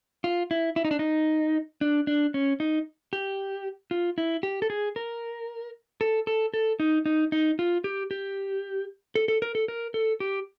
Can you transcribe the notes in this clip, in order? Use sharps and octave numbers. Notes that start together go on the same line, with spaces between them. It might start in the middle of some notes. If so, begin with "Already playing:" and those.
F4
E4
E4
D#4
D4
D#4
D4
D4
C#4
D#4
G4
F4
E4
G4
A4
G#4
A#4
A4
A4
A4
D#4
D#4
D#4
F4
G4
G4
A4
A4
A#4
A4
A#4
A4
G4